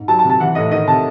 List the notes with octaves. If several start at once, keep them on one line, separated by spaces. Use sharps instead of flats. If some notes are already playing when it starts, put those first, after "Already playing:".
Already playing: G#2
F#3 A5
A5
C3
A5
E3 F#5
A2 D#5
D#3 D#5
C3 A5